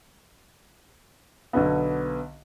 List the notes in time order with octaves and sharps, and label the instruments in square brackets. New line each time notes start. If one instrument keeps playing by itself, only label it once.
[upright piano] B1 D3 B3